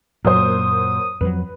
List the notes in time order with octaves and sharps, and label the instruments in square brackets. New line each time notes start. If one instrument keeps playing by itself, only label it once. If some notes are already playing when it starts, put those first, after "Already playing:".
[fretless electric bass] F#2 A#2 [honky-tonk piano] F#3 A#3 C5 [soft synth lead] D#6
[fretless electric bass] F2 F3 F#3 [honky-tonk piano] B4